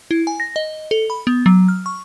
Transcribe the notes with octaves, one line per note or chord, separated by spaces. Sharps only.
E4
G#5
A#6
D#5
A4
B5
B3
F#3
F6
C#6